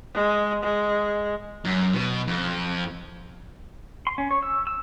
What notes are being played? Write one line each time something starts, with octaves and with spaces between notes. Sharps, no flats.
G#3
G#3
F#2
B2
F2
C6
C#4
C#5
E6
E6